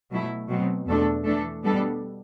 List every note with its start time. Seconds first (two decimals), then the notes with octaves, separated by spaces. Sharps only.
0.11 B2 F#3 A3 E4
0.49 B2 F#3 C4
0.86 E2 B2 A3 D4 A4
1.25 E3 A3 D4 A4
1.64 B2 G3 B3 D4 A4